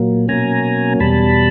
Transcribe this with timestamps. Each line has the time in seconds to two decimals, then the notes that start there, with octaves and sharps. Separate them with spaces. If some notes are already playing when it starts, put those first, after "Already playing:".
Already playing: A#2 F#3 A#3
0.28 B2 F#3 A#3 C#4 G#5 A#5
1.00 E2 B2 G3 A5 B5